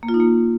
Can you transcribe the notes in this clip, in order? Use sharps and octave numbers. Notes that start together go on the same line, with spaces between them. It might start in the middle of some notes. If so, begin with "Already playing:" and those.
A#3
F4
D#4
A#3